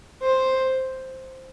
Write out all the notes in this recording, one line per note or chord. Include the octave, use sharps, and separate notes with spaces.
C5